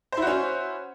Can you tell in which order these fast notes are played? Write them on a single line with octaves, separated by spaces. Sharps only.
C5 E4 F#4 C#4